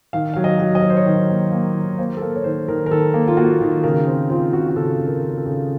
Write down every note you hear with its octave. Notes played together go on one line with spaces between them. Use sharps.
D#3 F5
F#3 F5
D#5
F#3
D#5
F#3 C#5
C5
C#5
D#3
A#3
A#3
D#3
A#3 C5
A4
A#3 A#4
C#5
D#3 C5
D#3 A#4
A#4
D#3 A4
A#3
F4
A#3 F#4
D#3
C#3 A#4
C4
C4 F4
C#3 F#4
F#4
C#3 A4
C#3
A#4
C#3
A#4
A4
C#3